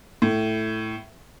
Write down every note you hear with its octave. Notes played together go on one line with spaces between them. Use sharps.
A2